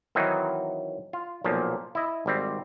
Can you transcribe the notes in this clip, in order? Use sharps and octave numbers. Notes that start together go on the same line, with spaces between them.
D#3 E3 F#3 C4 D#4
F4
B1 A#2 F3 A#3
E4 D#5
G#1 G3 C4